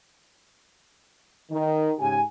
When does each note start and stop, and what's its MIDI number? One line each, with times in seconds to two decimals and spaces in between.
1.51 1.93 51
1.99 2.21 44
1.99 2.21 49
1.99 2.21 67
1.99 2.21 80